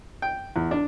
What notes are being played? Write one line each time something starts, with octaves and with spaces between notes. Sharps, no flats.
G5
E2
D4